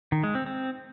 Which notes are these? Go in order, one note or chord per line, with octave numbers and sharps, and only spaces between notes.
D#3
G#3
C4
C4